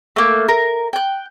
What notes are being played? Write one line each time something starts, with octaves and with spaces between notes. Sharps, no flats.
A3 A#3
A#4
G5 F#6